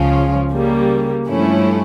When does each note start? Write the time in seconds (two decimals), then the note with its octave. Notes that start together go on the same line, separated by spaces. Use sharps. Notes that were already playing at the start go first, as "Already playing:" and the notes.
Already playing: C#2 C#3 F3 C#4 F4
0.51 C#3 G3 A#3
1.27 G2 F3 A3 C#4 E4